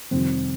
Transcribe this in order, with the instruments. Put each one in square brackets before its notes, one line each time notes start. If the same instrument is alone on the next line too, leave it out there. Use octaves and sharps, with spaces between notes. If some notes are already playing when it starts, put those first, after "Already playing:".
[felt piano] F2 C3 D#3 G3 C4